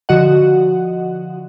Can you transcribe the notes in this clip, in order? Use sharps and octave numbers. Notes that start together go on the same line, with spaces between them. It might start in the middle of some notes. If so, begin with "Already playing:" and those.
D3 F3 F#4 D#5 F#5